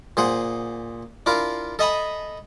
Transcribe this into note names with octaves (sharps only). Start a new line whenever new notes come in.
A#2 G#4 C5 F#5
D4 E4 F4 A#4 F5
A4 D#5 E5 G#5 A#5 B5